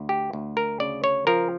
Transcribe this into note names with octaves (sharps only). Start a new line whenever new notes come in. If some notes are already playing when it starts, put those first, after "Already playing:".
Already playing: D2
G4
D2
A#4
C#3 D5
C#5
F3 A#4